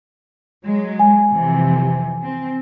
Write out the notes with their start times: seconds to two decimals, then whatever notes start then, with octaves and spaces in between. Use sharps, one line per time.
0.64 F#3 G#3
0.99 G#5
1.30 F2 C3 E3
2.25 C4